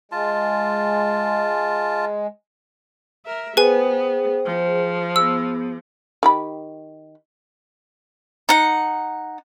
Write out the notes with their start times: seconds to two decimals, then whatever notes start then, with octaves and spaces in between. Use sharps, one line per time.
0.12 G#3 F4 A5
3.26 A#4 E5
3.57 B3 G#4 B4 C5 G5 G#5
4.46 F3
5.16 B3 G#4 E6
6.23 D#3 G4 B5
8.49 D#4 F#5